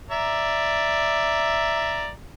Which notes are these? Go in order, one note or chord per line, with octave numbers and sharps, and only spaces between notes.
D5 E5 A#5